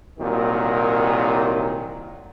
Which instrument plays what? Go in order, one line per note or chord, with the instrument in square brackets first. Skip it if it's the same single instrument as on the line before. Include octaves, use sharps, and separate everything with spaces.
[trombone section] C2 A#2 D#3 F#3